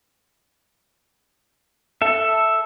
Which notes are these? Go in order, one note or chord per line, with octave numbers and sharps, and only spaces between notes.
A4 E5